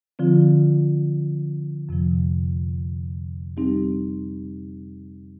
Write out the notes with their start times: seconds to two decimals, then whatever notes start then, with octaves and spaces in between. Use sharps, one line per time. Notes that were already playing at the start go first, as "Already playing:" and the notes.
0.19 D3 F3 C4 F4
1.89 F2 C3 F3
3.57 G3 C4 D#4 G4